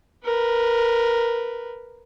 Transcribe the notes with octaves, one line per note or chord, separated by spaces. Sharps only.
A#4 B4